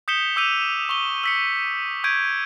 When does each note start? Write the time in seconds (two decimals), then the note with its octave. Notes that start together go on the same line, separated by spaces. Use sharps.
0.08 D#6 G6 B6 C#7 E7 G7
0.36 D6 E6 G6 D#7 F7
0.89 C#6 G7
1.24 E6 B6 C#7
2.04 C#6 G6 G#6 D7 D#7